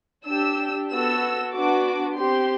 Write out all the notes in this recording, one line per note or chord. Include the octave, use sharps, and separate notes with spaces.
D4 G4 E6
B3 F#4 A4 E6
B3 D4 F#4 D6
C4 G4 C6